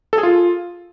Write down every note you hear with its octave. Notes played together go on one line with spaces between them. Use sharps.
A4
G#4
F4